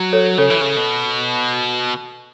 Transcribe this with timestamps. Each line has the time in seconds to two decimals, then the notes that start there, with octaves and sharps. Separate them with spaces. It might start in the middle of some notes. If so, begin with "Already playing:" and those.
Already playing: F#3
0.13 A4 C#5
0.38 C#3 A4 C#5
0.50 E3
0.61 C#3
0.77 B2